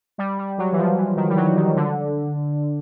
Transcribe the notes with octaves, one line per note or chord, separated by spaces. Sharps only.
G3
G3
F#3
E3
F3
E3
D#3
G3
F#3
D#3
D3